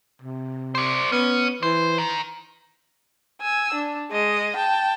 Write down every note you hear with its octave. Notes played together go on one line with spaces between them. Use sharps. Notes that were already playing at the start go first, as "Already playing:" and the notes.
C3
C5 D5
B3 C#4
E3 C5
D#3
G#5 E6
D4
G#3 D#5
G5 A5